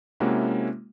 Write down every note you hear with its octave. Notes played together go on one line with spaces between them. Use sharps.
C3 G#3 A#3 C#4 E4 F#4